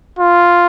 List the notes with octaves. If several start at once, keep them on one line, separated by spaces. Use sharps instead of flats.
F4